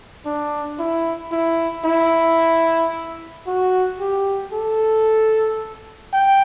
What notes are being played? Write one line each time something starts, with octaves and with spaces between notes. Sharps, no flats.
D4
E4
E4
E4
F#4
G4
A4
G5